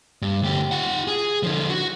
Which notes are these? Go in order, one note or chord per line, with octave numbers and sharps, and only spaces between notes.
G2
D2 G4
F4 F#5
G#4
D3 F3
F#4